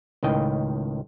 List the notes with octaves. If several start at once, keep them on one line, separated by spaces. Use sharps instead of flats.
C#2 A2 D#3 D#5 G5